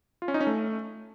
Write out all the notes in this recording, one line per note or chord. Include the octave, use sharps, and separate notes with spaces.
F4
C#4
D#4
C#4
A3